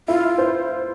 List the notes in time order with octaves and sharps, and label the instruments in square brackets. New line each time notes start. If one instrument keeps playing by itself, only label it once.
[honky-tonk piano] E4 [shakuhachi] F4
[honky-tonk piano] C5